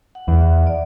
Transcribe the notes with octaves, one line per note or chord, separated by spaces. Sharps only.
F#5
E2
E5
D5